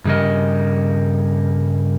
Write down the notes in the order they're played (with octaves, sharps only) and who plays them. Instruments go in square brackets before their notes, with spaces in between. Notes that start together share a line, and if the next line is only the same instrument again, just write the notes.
[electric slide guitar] G2 C#3 G3 A#4 D#5